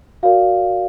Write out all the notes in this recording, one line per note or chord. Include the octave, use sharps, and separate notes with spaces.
F#4 A#4 D5 F5